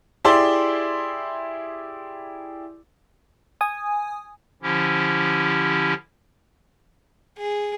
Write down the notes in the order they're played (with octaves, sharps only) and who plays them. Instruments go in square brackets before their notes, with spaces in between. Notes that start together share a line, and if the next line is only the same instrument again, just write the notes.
[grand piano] E4 G4 G#4 D5 C6 E6
[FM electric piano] G#5 D#6
[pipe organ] D3 F3 C#4 E4 G4
[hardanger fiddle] G#4